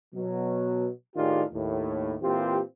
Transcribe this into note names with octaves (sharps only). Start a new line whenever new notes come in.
B2 F#3
A2 D#3 D4 F4 G4 G#4
D#2 A2
A#2 E3 C4 F4 G4